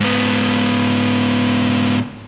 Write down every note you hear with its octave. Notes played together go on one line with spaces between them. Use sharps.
G#2 B3